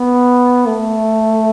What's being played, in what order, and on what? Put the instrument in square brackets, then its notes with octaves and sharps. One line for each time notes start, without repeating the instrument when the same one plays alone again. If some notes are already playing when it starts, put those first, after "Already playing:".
Already playing: [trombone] B3
A3